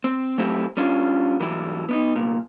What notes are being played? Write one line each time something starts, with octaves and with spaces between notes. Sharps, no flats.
C4
F#3 A3 C4 E4 G4
G3 C#4 D4 F4
G#2 E3 F#3 G3 E4
B3 D4 D#4
C2 A#2